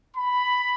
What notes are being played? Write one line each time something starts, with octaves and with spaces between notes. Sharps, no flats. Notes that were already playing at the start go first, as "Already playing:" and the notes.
B5